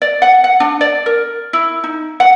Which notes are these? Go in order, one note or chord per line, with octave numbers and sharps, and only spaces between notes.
D5
F#5
F#5
D4
D5
A#4
E4
D#4
F#5